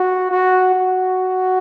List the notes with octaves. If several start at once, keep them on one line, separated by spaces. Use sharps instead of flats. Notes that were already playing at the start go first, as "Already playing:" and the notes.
Already playing: F#4
F#4
F#4